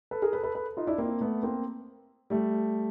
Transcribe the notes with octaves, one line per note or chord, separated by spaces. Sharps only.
A4 B4
G#4 A#4
A4 B4
A4 B4
A4 B4
D#4 F4
D4 E4
A#3 C4
A3 B3
A#3 C4
G3 A3